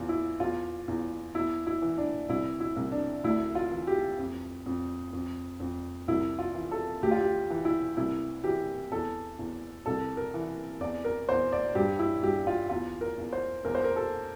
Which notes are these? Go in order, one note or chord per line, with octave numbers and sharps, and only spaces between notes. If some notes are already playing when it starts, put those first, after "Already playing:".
Already playing: E2 F4
E4
E2 F4
E2
E2 E4
E4
E3
D4
C2 E4
E4
C2
D4
D2 E4
F4
E3
G4
F2
F2
F2
F2
C2 E4
F4
E3
A4
D2 G4
F4
G4
E3
E4
C2 E4
E3 G4
E2 A4
E2
C2 A4
A#4
E3
E2 D5
A#4
E2 C5
D5
G2 G4
E4
G2 G4
F4
E2 F4
A#4
E2
C5
E2 A#4
C5
A#4
A4